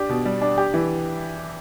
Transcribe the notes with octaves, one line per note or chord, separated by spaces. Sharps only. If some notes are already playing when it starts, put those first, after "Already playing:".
Already playing: D4 G4
B2
G3
D4
G4
E3